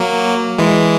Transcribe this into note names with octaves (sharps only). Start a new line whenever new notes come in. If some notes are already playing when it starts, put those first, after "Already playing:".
Already playing: F#3 A#3
E3 G#3